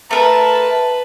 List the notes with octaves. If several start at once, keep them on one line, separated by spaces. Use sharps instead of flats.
A3 A#4 B4 A5